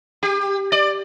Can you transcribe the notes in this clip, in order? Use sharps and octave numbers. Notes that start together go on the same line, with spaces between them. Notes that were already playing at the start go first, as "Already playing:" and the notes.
G4
D5